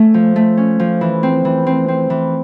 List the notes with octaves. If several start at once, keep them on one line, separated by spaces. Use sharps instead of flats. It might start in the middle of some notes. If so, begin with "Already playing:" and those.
Already playing: A3 C#4
F3
A3
C#4
F3
E3
C4
E3
C4
C4
E3